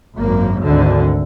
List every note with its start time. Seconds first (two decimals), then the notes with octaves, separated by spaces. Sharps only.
0.17 G#1 F#2 A#3
0.62 G#1 D2 D3